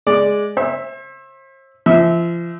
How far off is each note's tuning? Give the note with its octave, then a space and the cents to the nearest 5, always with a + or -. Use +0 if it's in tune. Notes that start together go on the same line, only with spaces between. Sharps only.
G#3 +0 D5 +0
C5 +40 E5 +0
F3 -35 E5 -15